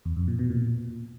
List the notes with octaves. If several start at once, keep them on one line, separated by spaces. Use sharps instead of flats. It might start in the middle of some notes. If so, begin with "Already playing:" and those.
E2
F2
A#2
B2
A#2